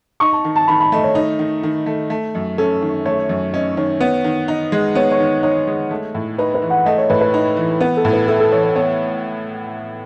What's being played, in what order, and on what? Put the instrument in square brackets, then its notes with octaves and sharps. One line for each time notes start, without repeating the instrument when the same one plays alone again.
[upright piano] D#4 [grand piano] C#6
[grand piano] A5
[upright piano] D#3
[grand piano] A5
[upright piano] D#3 [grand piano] B5
[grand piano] B5
[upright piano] A3 [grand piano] D#5
[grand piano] C#5
[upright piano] D#4
D#3
D#3
A3
A3
F#2
[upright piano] C#4 [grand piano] A4
[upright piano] D#3
[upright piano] A3 [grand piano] C#5
[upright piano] F#2
[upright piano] C#4 [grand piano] D#5
[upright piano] D#3 [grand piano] C#5
[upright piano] B3 [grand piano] C#5
[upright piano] D#3
D#4
G#3
[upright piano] B3 [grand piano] C#5
[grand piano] C#5
[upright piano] D#3
[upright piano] D#4 [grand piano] C#5
[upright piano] G#3
A3
A2
[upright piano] D#4 [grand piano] B4
[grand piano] B4
[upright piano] E3
[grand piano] F#5
[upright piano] A3 [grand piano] D#5
[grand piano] C#5
[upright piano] A2 [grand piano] B4
[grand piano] B4
[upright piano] D#4
E3
[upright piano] B3 [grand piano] B4
[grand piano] A4
[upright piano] A2
[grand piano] B4
[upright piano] E4 [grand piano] A4
[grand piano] A4
[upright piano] E3 [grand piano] C#5
[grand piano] C#5
[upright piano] B3 [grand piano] C#5